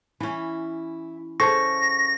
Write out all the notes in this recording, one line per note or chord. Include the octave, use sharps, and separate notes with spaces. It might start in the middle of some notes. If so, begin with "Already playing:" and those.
E3 C#4 E4
C#3 A4 C5 A5 C#6 A#6